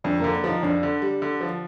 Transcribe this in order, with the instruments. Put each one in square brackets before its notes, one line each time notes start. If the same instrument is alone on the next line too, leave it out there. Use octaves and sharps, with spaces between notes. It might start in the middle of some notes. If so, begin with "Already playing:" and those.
[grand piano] F2 [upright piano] D4
[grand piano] D3 [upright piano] A#3
[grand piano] F3 [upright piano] D#4
[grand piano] F2 [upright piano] D4
[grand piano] D3
G3
D3
F3